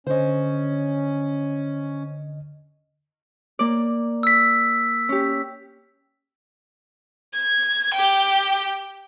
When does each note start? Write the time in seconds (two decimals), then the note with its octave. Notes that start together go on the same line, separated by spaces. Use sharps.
0.07 D3 C#4 C5 C#5 D#5
3.59 A#3 D5
4.23 E6 B6
5.09 C#4 G4
7.33 G#6
7.94 G4 G5